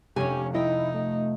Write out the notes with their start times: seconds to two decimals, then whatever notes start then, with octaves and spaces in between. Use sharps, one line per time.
0.16 F1 C#4 G4 C#5 G#5
0.54 D#4 E4 D#5 G5
0.94 A3